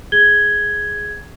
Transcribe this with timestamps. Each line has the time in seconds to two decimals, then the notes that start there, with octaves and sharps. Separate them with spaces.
0.12 G#4 G#6 G7